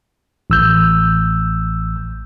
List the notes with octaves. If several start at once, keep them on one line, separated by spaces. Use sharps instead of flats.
A1 E6 G6